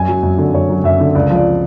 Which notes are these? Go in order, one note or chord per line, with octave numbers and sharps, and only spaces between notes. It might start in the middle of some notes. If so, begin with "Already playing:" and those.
Already playing: F#2 G#5
F#3
F#2
D3
F#2 C#5
F#3
F#2 E5
D3
C#2 D5
F3 D5